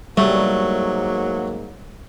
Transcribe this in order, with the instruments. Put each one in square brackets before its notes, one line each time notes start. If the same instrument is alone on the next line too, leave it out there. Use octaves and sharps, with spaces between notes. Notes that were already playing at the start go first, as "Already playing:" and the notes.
[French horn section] G#2 A#3 [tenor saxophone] F#3 [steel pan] G3 [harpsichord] A3